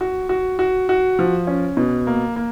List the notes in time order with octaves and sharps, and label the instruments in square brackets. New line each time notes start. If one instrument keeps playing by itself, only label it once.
[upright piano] F#4
F#4
F#4
F#4
F3
C#4
B2
A#3
A#3